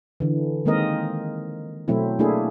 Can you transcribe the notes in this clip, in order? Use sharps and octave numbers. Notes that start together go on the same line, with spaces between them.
D3 E3
D#3 G#3 A#3 C4 A#4 D#5
B2 F#3 A3 C4 E4
A3 A#3 D4 E4 G#4